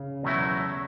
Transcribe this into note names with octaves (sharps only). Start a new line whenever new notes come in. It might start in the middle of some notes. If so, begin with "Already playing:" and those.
Already playing: C#3
E2 B2 F#3 A3 E4